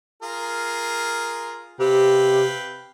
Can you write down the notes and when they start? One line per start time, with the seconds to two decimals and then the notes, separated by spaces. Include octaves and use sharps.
0.23 F4 G#4 A#4
1.80 C3 B4 F5 G5